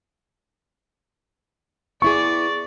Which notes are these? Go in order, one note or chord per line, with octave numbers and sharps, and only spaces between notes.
B3 E4 G#4 D5 C#6